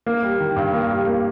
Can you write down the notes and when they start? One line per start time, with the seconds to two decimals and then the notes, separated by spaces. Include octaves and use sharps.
0.06 A#3
0.23 G3
0.40 D#3
0.56 G2
0.73 A#3
0.91 G3
1.06 A#3